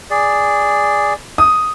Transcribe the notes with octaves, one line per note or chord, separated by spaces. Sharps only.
G#4 D5
D#6